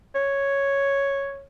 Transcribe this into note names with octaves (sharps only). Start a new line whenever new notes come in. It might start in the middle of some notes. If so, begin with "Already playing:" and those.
C#5